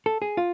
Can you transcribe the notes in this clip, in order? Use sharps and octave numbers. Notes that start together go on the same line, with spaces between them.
A4
G#4
F4